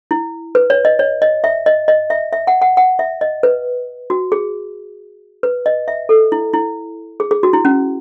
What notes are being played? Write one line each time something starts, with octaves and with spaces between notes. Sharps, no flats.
E4
B4
C#5
D#5
C#5
D#5
E5
D#5
D#5
E5
E5
F#5
F#5
F#5
E5
D#5
B4
F#4
G#4
B4
D#5
E5
A4
E4
E4
G#4
G#4
F#4
E4
C#4